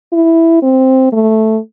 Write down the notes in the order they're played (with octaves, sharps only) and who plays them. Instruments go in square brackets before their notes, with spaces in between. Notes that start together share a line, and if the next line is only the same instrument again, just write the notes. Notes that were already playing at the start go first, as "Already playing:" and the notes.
[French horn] E4
C4
A3